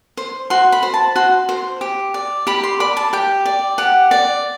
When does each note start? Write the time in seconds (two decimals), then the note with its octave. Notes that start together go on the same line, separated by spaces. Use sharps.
0.17 C5
0.50 F#4 C6
0.72 B5
0.83 C5
0.94 A5
1.16 F#4 C6
1.49 C5
1.81 G4
2.14 D5
2.47 G4 B5
2.64 C6
2.80 D5 B5
2.97 A5
3.13 G4 G5
3.46 D5
3.78 G4 F#5
4.11 D5